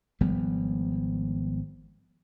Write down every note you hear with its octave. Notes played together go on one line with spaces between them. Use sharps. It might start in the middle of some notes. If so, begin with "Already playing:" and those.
G#1 F3 G3 B3